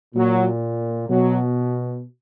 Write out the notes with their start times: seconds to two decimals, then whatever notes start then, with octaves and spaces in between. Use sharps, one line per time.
0.15 A#2 F#3
1.08 B2 F#3